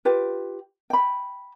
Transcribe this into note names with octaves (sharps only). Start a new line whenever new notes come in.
F4 G4 B4
G5 B5